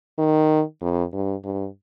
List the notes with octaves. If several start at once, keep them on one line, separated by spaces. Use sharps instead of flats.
D#3
F2
G2
G2